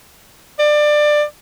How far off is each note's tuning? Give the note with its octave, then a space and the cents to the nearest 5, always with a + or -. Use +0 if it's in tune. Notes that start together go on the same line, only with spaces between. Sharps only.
D5 +20